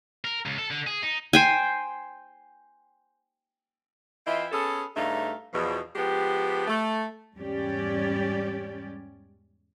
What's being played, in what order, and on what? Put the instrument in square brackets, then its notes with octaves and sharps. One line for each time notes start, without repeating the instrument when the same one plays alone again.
[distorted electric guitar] A#4
C#2
A4
D3
G#4
D#4
[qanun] C5 G5 G#5
[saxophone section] E3 C4 E4 F4 D#5 E5
B3 C#4 G#4 A4
G2 C#3 A3 D#4 E5 F5
E2 B2 F3
F3 G#3 B3 G4
A3
[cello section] E2 G#2 G3 C#4 G4 D5